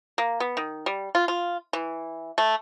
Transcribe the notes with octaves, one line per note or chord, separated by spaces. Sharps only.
A#3
B3
D#3
G3
F4
F4
E3
A3